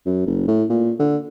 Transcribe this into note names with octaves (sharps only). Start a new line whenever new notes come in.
F#2
F#1
A2
A#2
D3